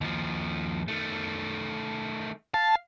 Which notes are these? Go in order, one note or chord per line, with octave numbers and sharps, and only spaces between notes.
D#2 F3
D#3 A3
F5 A5